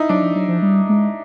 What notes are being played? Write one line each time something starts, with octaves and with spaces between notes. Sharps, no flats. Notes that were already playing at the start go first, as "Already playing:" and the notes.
Already playing: D#4 E4
F#3 D4
F3
F#3
F3
G3
G#3